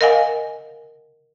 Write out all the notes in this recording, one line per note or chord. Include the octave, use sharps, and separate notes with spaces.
A#4 D#5 F5 F#5 G#5